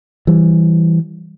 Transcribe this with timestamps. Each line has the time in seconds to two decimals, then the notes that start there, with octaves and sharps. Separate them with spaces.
0.27 E3 G3